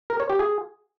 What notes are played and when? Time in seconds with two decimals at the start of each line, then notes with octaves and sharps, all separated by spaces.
0.10 A#4
0.20 C#5
0.30 G4
0.39 G#4